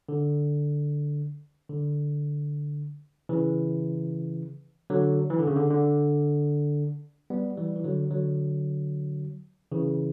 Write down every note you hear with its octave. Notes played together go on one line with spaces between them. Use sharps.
D3
D3
C#3 E3
D3 F#3
E3
D3
C#3
D3
D3
G3 B3
E3 G3
E3
D3 F#3
D3 F#3
C#3 E3